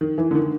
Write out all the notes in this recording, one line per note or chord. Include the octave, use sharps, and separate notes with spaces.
D#3
E3
D3
D#3